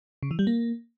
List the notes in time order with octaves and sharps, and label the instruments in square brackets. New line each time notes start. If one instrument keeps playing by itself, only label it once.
[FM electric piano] C#3
E3
G3
A#3